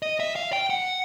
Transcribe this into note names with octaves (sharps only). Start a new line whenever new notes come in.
D#5
E5
F5
G5
F#5